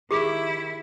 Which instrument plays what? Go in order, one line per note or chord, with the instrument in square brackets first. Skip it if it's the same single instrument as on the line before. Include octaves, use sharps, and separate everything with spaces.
[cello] D#3 E4 [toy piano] G4 G#4 D6